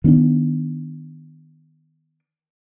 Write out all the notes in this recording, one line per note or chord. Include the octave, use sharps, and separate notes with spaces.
D#3 B3 C#4 D4